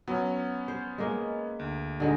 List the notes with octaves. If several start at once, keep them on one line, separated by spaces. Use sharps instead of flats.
F#3 B3 C#4
C5
G#3 A#3
D2
D3 G#3 D#4